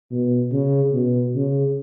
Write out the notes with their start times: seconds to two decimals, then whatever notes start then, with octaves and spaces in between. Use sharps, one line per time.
0.12 B2
0.52 C#3
0.93 B2
1.35 C#3